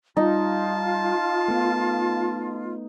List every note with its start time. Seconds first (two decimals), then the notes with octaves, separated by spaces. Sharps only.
0.17 G3 D#4 F4 A5
1.48 A3 B3